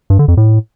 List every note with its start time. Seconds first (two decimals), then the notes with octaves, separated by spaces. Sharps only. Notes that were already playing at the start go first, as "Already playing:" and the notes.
0.10 G2
0.19 D3
0.28 F2
0.37 A2